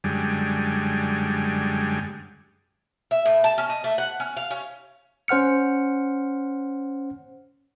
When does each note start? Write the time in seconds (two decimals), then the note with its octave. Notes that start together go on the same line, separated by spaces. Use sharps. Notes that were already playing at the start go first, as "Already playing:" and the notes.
0.04 F#2 D3 G3 G#3
3.11 E5
3.25 A2
3.44 A5
3.58 C#4
3.69 D#5
3.84 A3
3.98 F#5
4.20 C#4
4.37 F5
4.51 C#4
5.28 C#4 C5 F#5 F6 C#7